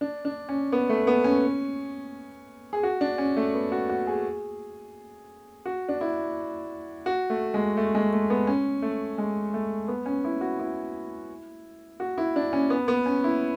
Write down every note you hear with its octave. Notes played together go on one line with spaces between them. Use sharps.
D4
D4
C#4
B3
A3
B3
C#4
G#4
F#4
D4
C#4
A3
B3
F#4
F#4
G#4
F#4
D4
E4
F#4
A3
G#3
A3
G#3
A3
B3
C#4
A3
G#3
A3
B3
C#4
E4
F#4
E4
F#4
E4
D4
C#4
B3
B3
C#4
E4